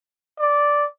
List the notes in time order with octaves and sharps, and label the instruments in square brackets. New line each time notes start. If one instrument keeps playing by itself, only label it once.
[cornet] D5